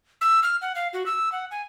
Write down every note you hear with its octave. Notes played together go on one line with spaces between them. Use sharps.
E6
F6
F#5
F5
F#4
E6
F#5
G#5